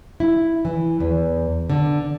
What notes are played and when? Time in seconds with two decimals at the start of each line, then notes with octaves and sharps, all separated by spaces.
0.20 E4
0.65 E3
1.00 E2
1.70 D3